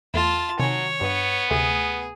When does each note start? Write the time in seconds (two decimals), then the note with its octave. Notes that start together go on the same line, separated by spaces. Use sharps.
0.14 E2 A3 F4 A5 A6
0.59 C3 D#3 F#3 C#5 G#5
1.01 G2 B3
1.51 D2 C3 A3 G#4